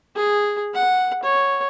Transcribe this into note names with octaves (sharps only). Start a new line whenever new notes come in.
G#4
F#5
C#5